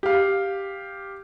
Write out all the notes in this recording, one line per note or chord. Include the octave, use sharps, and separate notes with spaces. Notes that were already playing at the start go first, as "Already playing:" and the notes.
G4 F5